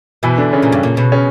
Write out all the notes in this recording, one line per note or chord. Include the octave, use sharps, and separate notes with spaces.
B2 E3 E4
D3 D4
C#3 C#4
A#2
G2
A#2
B2
C#3 C#4